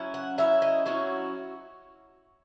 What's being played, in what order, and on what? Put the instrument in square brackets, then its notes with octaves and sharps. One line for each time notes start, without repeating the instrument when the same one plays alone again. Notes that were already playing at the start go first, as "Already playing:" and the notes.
Already playing: [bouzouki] F#3 C#4 E4
F#5
F#3 C#4 E4 E5
D#5
F#3 C#4 E4 F#4